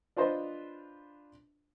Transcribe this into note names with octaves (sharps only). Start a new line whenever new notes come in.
D4 F4 B4 C5 D#5